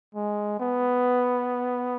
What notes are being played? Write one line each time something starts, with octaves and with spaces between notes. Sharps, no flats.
G#3
B3